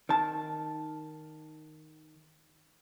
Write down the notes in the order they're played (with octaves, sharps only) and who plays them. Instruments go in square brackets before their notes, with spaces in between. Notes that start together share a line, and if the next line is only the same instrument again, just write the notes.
[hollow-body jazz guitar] D#3 A5